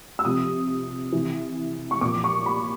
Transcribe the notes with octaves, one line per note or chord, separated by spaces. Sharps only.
E6
C3 F3 D#6
C3 E3
C#6
A#2 F3 D6
C#6
B5